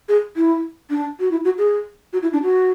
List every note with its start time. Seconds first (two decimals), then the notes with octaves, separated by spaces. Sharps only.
0.09 G#4
0.36 E4
0.90 D4
1.20 F#4
1.31 E4
1.45 F#4
1.58 G#4
2.13 F#4
2.22 E4
2.33 D4
2.43 F#4